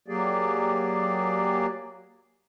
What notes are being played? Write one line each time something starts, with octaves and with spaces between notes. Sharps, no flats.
F#3 A#3 G4 G#4 D5